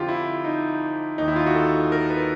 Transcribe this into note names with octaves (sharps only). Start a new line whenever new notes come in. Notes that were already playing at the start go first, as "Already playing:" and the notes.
Already playing: F2 D3 F3 F4 G4
E4
D#4
D#2 D#3 D#4
E4
F4
F#4
A4
A#4
B4